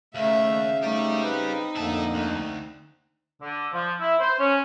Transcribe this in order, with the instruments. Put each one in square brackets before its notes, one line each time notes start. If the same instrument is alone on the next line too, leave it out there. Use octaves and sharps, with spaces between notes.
[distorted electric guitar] D#2 [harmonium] C#3 F5 [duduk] A3 [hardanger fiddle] E5
[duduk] A3 [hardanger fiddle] C4 D#4 [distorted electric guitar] G4 D5
[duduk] B4
[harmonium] F2 D3 [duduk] A#3 [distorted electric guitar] E4 A5
[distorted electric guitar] D2
[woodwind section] D3
F3
E4
C5
C#4